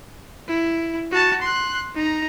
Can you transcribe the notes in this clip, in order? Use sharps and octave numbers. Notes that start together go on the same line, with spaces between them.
E4
F#4 A5
C6 F#6
D#4 A#5